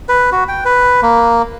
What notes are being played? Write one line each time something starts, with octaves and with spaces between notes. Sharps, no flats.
B4
F#4
G5
B4
A#3